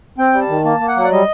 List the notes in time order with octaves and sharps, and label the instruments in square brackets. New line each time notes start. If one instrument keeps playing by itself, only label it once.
[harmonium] C4 G5
G3
A5
D#3
A#3 A5
A#3
F#5
F#3
D5
G3 D#5